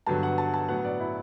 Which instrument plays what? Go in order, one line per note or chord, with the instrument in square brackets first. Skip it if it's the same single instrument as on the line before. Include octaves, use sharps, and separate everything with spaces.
[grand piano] G2 D3 F#3 B3 A5
F#5
A5
A5
A2 F#3 B3 F#5
D5
E4